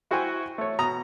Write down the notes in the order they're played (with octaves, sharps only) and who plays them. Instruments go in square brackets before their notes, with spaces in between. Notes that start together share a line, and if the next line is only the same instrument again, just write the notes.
[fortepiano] E4 F#4 C5 E5 G5 G#5
A3 C#5
B2 A#5 D#6